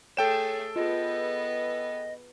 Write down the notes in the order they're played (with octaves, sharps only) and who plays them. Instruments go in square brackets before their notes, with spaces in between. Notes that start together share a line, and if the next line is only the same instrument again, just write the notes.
[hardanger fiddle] A3 G#4 [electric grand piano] A4 G5 E7 [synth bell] C#5
[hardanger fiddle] B3 B4 [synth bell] F4 G#4 [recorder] D#5